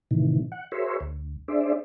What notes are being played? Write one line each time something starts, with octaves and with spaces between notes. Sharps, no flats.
A2 C3 D#3 E3
F#5
F#4 G#4 A#4 C5 C#5 E5
D2
D4 G#4 C5 D5 E5